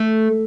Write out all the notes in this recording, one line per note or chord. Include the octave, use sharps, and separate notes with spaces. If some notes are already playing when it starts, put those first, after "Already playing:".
Already playing: A3